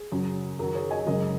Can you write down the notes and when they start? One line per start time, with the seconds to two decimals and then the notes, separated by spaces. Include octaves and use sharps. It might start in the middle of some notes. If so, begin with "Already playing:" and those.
Already playing: G#4
0.12 F#2 C#3 F#3
0.59 F#2 D#3 F#3 A#4
0.75 G#4 C#5
0.91 D#5 G#5
1.07 F#1 F#2 C#3 G#3 A#4 D#5